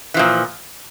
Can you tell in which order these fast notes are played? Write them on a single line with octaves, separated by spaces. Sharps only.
E3 F3 A#2